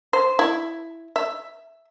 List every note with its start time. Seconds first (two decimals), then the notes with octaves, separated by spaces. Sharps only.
0.13 C5
0.39 E4
1.16 E5